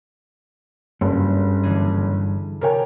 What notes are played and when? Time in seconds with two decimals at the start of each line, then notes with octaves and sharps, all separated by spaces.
1.01 F#1 G2
1.63 D3 E3 G#4
2.61 C3 A#4 C#5 G5